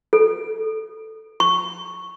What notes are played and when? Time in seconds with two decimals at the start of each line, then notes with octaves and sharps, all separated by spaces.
0.13 A4
1.40 C#6